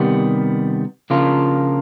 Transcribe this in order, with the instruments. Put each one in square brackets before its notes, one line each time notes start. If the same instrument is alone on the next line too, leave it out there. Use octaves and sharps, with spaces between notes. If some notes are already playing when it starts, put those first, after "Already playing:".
Already playing: [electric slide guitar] C3 D#3 G3 B3
C#3 F3 A#3 D4 F4